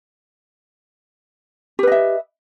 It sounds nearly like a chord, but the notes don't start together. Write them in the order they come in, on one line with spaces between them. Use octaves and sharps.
G4 B4 D#5 E5